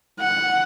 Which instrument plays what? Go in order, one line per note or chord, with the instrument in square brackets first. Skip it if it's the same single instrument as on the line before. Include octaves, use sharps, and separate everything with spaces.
[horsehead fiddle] F#5